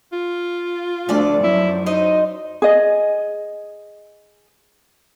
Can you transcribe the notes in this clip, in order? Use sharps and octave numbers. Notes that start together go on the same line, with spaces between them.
F4
D2 F3 A4 D5
F#2 E4
D#4 C5 D#5
G#4 D#5